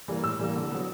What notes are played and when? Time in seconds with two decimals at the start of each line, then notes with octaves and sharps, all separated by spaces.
0.08 E3 G3 A#3
0.24 A2 E6
0.39 E3 G3 A#3
0.56 D3
0.71 F#3 B3